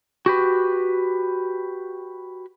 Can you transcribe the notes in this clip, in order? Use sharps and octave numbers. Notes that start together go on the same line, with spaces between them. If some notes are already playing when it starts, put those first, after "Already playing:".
F#4 G4 B4